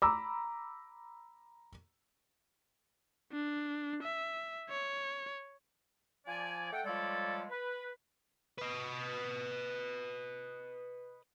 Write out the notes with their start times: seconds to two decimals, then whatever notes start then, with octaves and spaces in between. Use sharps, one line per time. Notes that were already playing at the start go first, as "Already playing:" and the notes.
0.02 A#5 B5 D6 E6
3.32 D4
4.03 E5
4.70 C#5
6.26 F3 D5 G#5
6.72 A3 A4 F#5 G5
6.85 F3 G3 G#3 A4 C#5 D5
7.50 B4
8.58 B4 D#5